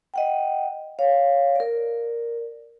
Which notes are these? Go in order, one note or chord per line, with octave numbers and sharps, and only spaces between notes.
D#5 F#5 G5
C#5 F5
A#4 D5